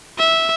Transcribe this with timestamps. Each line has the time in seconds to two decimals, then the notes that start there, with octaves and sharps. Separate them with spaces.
0.18 E5